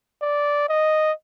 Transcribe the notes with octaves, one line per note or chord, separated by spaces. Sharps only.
D5
D#5